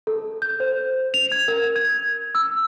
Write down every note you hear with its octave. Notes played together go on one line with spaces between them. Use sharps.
A4
G6
C5
F7
G#6
A#4
G#6
E6